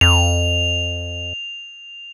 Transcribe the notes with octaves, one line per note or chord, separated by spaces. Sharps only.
F2 F7